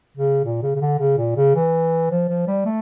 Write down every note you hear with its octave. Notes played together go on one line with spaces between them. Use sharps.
C#3
A#2
C#3
C#3
D3
C#3
A#2
C#3
E3
F3
F3
G3
A3